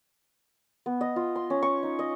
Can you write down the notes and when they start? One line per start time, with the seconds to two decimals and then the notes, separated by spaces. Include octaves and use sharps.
0.86 B3
1.01 D#5
1.16 F4
1.35 C6
1.50 C#4
1.62 C#6
1.83 D#4
1.99 D#5